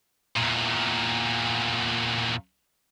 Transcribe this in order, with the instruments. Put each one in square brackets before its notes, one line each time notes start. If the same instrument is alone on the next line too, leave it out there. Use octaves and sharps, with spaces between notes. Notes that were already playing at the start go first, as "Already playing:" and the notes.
[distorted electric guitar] E2 A#2